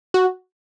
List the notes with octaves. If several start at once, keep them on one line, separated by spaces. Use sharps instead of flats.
F#4